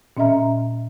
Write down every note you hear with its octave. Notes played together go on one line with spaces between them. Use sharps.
A#2 C#4 D#5 E5 A#5